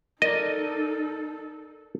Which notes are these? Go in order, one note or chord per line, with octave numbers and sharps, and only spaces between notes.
D#4 A4 A#4 D5 D#5